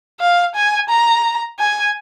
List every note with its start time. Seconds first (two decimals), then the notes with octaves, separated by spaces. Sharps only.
0.20 F5
0.55 G#5
0.90 A#5
1.59 G#5